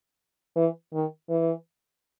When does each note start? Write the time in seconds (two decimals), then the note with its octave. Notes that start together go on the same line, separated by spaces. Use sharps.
0.56 E3
0.93 D#3
1.29 E3